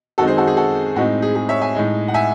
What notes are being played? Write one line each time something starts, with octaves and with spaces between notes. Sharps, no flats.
F#2 D#3 G#3 C4 D#4 F#4 A4
G#4 C5
F#4 A4
G#4
F#4 A4
A2 G#3 C4 D#4 F#4
G#4
G#4
C#5 E5
E5 G#5
A2 G#3 D#4
F#5
E5 G#5